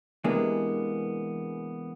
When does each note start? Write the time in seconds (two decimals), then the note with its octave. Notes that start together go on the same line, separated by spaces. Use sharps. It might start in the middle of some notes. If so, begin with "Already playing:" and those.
0.24 C3 E3 G#3 A#3 B3 D4